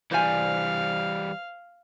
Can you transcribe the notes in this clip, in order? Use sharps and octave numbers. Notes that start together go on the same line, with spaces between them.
E3 G3 C5 D5 F5 G#5